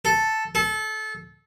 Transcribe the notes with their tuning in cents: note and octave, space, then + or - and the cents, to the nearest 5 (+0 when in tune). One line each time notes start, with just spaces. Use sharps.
A4 +0
A4 -25